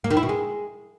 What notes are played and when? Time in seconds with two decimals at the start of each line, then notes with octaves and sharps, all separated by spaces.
0.04 A#3
0.11 D#3
0.17 E4
0.23 B2
0.29 G#3